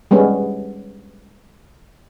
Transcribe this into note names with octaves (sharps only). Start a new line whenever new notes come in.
G3 G#3 B3 C#4